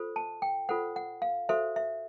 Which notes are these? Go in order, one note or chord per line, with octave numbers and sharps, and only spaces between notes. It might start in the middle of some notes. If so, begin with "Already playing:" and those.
Already playing: F4 A4 C5
A5
G5
F4 A4 C5 F#5
F#5
F5
F#4 A4 C5 E5
E5